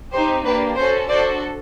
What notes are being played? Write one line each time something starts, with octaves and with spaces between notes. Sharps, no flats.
C4 D#4 G4 C5
A#3 D4 G4 B4
C#4 F#4 A4 C5
D4 F#4 A4 C5 D5